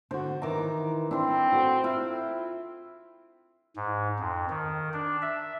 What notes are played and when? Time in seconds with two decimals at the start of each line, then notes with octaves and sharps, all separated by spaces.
0.11 D3 F#4 C5
0.42 D#3 E3 A#5 D6
1.11 C4 D4 E4 C6
1.52 F#4 A4
1.84 E4 F4 E5
3.76 G#2
4.19 F2
4.50 D#3
4.93 D4
5.22 E5